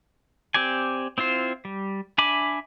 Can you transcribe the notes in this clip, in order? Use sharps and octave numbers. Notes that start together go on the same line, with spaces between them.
C4 G4 D5 G#5
C4 E4 F4 C5
G3
D4 E5 G#5 B5 D6